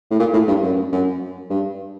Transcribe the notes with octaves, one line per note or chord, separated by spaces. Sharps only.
A2
A#2
A2
G2
F#2
F#2
G2